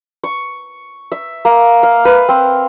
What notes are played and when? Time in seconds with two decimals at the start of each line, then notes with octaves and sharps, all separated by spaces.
0.24 C#6
1.12 E5
1.45 A#3
1.83 F5
2.05 B4
2.29 C4